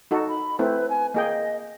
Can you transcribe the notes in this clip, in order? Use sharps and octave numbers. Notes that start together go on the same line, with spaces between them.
D#4 F#4 A4
B5
A3 C4 E4 B4
G#5
A#3 G#4 D#5 G5